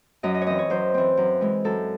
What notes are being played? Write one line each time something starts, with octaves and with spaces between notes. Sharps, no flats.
F#2 D#5
D#5
C#5
E3 C4 D#5
C#5
F#2 C5
E3 C4
F#2
E3 G#3
F#2 A4